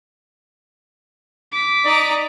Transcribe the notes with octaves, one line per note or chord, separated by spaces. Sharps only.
D6 B6
D#4 D5 A#5